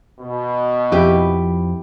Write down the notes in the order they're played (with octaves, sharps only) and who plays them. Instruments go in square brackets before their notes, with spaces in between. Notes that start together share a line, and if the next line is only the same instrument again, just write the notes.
[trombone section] B2
[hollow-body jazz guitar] F2 F3 [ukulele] E4 G4 B4